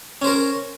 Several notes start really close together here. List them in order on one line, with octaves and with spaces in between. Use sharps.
C#4 C5 A#4